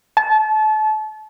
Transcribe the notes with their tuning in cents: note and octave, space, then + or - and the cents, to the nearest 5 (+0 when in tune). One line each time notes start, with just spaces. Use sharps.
A5 -30